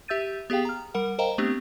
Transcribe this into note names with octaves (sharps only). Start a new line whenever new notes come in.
G4 E5 E6 G6 A6 D#7
B3 G4 G#4 F5 G5
A#5 F6
G3 A#4 F#5
A#4 C5 D#5 F5 G5 A#5
A3 B3 C4 D4 G4